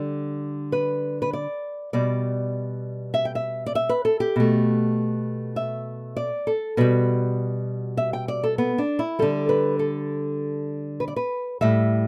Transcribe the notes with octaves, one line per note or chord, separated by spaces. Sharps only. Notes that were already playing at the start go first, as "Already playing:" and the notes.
Already playing: D3 G3 D5
B4
B4
D5
B2 G3 D5
E5
G5
E5
D5
E5
B4
A4
G4
B2 A3
E5
D5
A4
B2 G3 B4
E5
G5
D5
A4
B3
D4
E4
D3 G3 A4
B4
A4
B4
D5
B4
A2 G3 E5